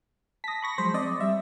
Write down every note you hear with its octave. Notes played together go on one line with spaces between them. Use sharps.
A5 D#6 A#6 B6
B5 C#6 A#6
F3 F#3 G#3 C5
C4 D5 D#5
G3 E5